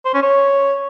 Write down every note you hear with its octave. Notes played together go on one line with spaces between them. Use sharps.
C5
C#4
C#5